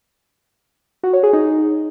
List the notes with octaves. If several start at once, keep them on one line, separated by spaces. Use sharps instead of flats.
F#4
C#5
G#4
D#4